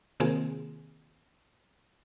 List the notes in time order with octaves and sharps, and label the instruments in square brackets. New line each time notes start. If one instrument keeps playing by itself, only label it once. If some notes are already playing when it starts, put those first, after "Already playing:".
[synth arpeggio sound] C3 D#3 A#3 C4 F4 G#4